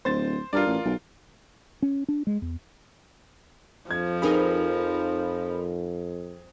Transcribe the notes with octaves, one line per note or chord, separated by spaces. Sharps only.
D1 C5 A6
G2 F4 A#4 D5
A1
B1
C#4
D4
G#3
E2
F2 F3 G#6
C4 D#4 G#4 A#4 B4 B5